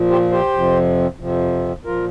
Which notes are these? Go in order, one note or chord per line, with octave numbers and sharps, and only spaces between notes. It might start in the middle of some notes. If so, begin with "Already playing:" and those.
Already playing: A#2 F3
G4 C5
G4 C5
F2 C3 F3
F2 C3 F3
A#2 F3 F4 A#4